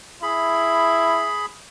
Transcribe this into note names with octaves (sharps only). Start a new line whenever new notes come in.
E4 G#4 B5